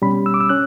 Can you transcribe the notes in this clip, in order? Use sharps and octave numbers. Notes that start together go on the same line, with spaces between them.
B2 G3 C#4 B5
E6
D6
E6
C#4 F#6